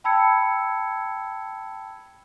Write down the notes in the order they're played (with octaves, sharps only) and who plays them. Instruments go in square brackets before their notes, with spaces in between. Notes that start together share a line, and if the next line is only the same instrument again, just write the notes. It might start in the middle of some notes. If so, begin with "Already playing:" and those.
[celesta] G5 A5 B5 E6 G#6 C#7